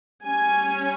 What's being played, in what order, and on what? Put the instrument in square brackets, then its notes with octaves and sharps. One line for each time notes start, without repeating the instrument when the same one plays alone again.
[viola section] G3 C#4 G#5